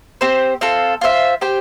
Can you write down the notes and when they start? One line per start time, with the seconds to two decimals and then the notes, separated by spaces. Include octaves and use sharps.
0.21 C4 G4 C5
0.61 C4 F4 A4
1.01 F4 C5 E5
1.41 G4 C5 G5